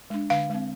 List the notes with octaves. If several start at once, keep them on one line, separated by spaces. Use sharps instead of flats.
G#3 D4
D3 F5
G#3 C4